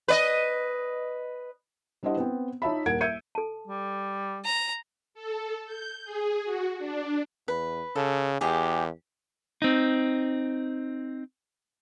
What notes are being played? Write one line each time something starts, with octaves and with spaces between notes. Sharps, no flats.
B4 D5 D#5
G3 D4 E4 C5 D#5 F#5
B3 C4
D#4 F4 C#5 E5 A5 B5
D#1 A#4 F#5 G#6 D7
E5 G6 G#6 C#7 D#7
A4 A5
G3
A#5
A4
G6
G#4
F#4
D4
E2 B4
C#3 A4
E2 G4 G#4
C4 D#4